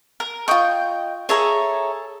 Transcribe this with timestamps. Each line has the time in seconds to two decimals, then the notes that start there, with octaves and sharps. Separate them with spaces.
0.20 A#4
0.48 F4 D#5 G5 C#6
1.29 G#4 A4 C#5 E5 A#5